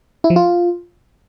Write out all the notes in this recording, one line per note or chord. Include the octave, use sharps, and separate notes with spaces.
E4
F3
F4